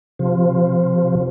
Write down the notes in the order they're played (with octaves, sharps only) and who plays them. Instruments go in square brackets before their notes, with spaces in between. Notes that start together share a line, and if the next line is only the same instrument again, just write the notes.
[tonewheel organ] C3 F3